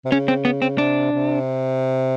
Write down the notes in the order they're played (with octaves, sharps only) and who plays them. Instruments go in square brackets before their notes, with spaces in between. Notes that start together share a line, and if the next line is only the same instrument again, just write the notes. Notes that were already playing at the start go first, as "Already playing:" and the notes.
[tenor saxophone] C3
[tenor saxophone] C#3 [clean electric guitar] C#4
[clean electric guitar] C4
B3
C4
[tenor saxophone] C3 [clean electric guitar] D4
[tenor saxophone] C3